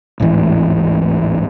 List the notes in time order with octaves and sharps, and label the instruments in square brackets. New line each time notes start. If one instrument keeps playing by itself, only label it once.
[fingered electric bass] D1 G#1 A2 E3